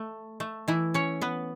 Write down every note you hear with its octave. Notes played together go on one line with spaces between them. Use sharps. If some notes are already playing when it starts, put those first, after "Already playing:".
Already playing: A3
A3
E3 E4
C#4 C#5
B3 B4